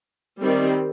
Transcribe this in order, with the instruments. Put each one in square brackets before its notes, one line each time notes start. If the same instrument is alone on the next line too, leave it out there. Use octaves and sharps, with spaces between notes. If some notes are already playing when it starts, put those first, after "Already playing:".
[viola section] D#3 G3 C4